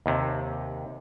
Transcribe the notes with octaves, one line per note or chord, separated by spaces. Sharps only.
D#2 C3